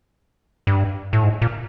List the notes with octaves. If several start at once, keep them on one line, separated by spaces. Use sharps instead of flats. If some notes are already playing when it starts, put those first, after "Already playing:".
G2
A2
G#2
A#2